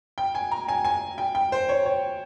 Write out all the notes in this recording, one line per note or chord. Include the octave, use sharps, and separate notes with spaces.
G5
G#5
A#5
G#5
G#5
G5
G5
C5
C#5
C#5